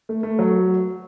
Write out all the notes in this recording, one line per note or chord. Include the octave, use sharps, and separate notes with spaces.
A3
A3
F#3